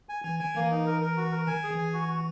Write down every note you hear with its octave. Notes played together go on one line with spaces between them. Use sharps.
G#5
E3 G#5
D#3 G#5
E3 A#3
D#4
A#4
A#4
F#4
A#4
D#3 G#5
G#4
E3
G#5
F#4
F#4